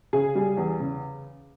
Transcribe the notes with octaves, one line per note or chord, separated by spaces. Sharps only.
C#3 G#4
G3
E2
C#3